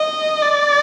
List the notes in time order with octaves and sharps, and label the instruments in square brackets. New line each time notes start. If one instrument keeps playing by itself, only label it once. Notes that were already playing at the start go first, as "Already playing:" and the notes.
Already playing: [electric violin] D#5
D5